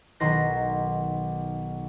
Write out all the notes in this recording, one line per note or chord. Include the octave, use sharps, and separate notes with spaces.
B1 D#3 B4 C6 F#6 A#6